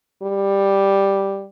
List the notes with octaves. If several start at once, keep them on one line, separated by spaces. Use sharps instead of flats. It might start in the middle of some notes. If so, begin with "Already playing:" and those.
G3